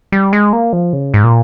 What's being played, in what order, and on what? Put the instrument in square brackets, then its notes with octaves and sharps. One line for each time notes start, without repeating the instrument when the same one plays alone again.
[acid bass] G3
G#3
A#3
F3
C#3
G#2
A#2